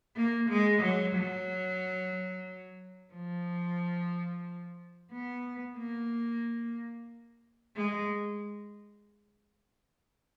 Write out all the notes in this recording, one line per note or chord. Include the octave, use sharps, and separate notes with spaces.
A#3
G#3
F#3
F#3
F3
B3
A#3
G#3